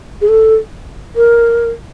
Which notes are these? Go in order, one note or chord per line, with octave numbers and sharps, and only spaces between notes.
G#4
A4
A#4